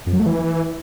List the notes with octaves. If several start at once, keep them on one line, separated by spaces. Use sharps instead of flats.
F2
F#3
A3
E3